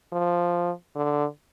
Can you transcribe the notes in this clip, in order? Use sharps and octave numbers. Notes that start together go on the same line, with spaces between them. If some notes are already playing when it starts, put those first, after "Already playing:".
F3
D3